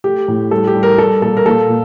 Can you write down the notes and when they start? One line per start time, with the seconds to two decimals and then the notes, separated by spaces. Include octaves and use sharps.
0.04 A3 G4
0.28 A2
0.51 G3 A4
0.67 G4
0.75 G3
0.83 A#4
0.98 G3 A4
1.22 A#2 A4
1.37 A#4
1.46 A#2 A4
1.69 A#2